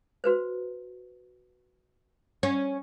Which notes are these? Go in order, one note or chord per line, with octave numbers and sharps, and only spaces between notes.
F#4 B4 C5
C#4 F#5